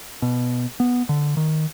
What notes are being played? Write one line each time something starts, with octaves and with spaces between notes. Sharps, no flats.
B2
B3
D3
D#3